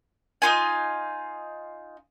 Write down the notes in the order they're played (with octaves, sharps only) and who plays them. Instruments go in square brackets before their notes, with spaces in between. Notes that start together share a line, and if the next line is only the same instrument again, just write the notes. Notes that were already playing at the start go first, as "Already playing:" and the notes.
[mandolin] D#4 F4 G#5